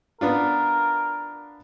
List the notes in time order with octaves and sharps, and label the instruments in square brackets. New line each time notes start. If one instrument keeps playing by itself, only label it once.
[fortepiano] B3 D4 F4 [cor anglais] A#4